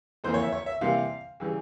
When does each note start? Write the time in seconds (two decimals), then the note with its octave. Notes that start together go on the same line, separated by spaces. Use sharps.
0.24 F2 E3 A#3 C5
0.34 C#5
0.42 E5
0.52 C#5
0.66 E5
0.81 C3 E3 G3 A#3 F5
1.40 C#3 E3 G3